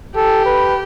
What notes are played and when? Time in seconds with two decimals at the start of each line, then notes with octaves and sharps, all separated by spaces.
0.16 G4 A4
0.45 B4